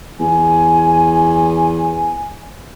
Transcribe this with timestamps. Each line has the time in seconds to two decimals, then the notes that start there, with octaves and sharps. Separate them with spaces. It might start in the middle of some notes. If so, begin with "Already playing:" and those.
0.20 E2 G#5